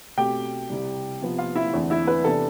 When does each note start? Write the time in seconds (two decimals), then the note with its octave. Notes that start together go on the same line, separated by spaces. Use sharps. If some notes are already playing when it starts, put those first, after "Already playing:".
0.17 B2 A3 C4 G4 G5
0.70 C2 C3 G3
1.22 C3 F3 B3
1.38 F4 F5
1.56 E4 E5
1.74 E2 D3 A3 C4
1.90 E4 E5
2.07 B4
2.24 C3 E3 B3 D4 A4